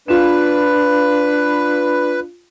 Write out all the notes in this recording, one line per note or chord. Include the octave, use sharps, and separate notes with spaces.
D4 F4 B4 E7